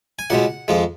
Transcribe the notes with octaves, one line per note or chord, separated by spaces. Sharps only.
G#5
C#2 B2 G#3 F#5
F2 F3 G#3